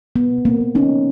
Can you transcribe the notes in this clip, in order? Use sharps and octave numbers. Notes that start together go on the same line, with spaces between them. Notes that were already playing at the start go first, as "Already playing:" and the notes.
C3 B3
C3
A#3 C4
A#3
C#4 D#4
F3